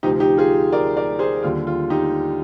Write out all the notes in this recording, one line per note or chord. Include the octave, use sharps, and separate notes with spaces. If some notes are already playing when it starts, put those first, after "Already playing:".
D2 C3 F3 D#4 G4
D#4 G4
F4 G#4
A#4 D5
A#4 D5
G#4 C5
D#2 D3 G3 F4
F4
D#4 G4